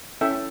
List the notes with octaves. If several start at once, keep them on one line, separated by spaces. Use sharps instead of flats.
C#4 E4 A4 E5 G5